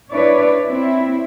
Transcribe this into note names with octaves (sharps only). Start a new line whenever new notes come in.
D4 E4 B4 C#5 D5
C4 E4